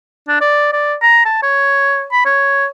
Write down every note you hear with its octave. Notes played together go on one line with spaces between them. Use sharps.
D4
D5
D5
A#5
A5
C#5
B5
C#5